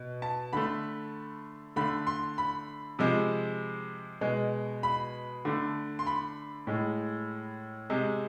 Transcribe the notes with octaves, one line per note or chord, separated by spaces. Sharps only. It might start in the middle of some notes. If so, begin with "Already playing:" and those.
Already playing: B2
A5
D3 A3 B5
D3 A3 B5
C6
B5
C3 F3 G#3
B2 G#3
B5
D3 A3
C6
B5
A2 G#3
C3 G#3